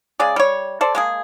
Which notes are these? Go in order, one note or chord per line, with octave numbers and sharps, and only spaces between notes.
C#3 G#3 G#4 D5
G3 C#5
A4 C5 D5
G#3 A#3 G#4